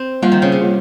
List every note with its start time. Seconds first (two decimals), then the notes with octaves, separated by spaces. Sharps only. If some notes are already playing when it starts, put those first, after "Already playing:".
Already playing: C4
0.22 F3 G3 A#3 F4
0.32 D#3
0.42 C#3
0.52 C3
0.61 G3 A#3 F4